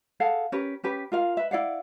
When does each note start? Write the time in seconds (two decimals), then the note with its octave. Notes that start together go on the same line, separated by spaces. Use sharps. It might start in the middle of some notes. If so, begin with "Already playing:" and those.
0.20 G#4 A4 F5 F#5
0.52 C#4 G4 A#4 B4
0.84 C#4 G4 B4
1.12 F4 A#4 F5
1.37 B4 E5
1.51 E4 D5 F5 F#5